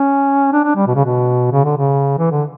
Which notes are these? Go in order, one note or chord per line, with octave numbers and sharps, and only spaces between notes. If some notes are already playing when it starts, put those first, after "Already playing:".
Already playing: C#4
D4
D4
G3
B2
C#3
B2
C#3
D3
C#3
E3
D3